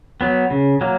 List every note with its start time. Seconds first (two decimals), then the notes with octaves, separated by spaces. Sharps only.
0.21 F#3 B3
0.50 C#3
0.81 F#3 A#3